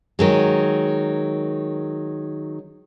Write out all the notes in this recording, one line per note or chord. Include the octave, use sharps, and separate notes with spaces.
D#3 F#3 G#3